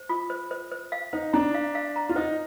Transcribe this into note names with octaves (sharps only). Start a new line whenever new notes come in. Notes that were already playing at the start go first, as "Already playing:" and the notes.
Already playing: C5
F4
C5
C5
C5
F5
D#4 C5
D4 A#5
F5
F5
A#5
F4
D#4 C5